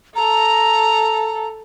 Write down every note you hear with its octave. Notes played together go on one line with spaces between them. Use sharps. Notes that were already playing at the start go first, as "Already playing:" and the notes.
A4 A#5